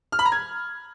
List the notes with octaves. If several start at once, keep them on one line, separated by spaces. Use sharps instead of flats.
F6
B5
A#5
G#6